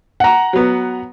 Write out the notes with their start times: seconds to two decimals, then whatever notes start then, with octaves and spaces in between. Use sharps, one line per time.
0.20 F#5 A#5
0.53 F#3 B3